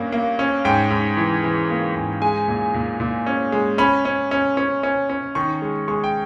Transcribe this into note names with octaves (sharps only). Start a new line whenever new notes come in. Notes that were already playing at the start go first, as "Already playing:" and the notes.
Already playing: G2 A#3 C#4
A#3
C#4
G#2 G5
G#2
E3
E3
A#3
G#2
G#3 G#5
A#2
A#2
A#2
C#4
G#3
C#4 B5
C#4
C#4
C#4
C#4
C#4
D#3 C#6
G#3
G#3 C#6
G5